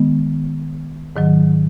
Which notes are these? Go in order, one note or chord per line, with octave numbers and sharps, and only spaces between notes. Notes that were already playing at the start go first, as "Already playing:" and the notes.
Already playing: D#3 G#3 B3
G#2 D#3 F#3